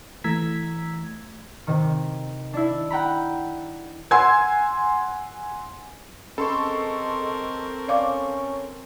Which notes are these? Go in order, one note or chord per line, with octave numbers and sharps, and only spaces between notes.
E3 A3 A#5 E6 G#6 B6
C3 D#3
D4 E4
F#5 G5 A#5 B5
F#5 G#5 C6 E6 G#6
G#3 C4 C#4 A4 A#4 C6 C#6
C#4 D5 F5 D6